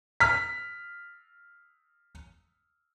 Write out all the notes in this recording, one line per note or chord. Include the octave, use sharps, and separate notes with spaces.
F6 B6